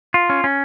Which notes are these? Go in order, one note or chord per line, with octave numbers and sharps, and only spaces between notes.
F4
C#4
C#4